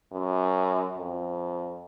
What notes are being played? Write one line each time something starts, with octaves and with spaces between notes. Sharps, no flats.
F#2
F2